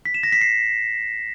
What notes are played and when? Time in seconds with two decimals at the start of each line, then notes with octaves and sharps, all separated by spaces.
0.05 B6
0.14 E7
0.23 A#6
0.32 B6
0.41 C7